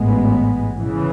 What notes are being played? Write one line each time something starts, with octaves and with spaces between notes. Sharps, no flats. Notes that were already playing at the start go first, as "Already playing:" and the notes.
Already playing: A1 G#2 G#3 B3
C#3 E3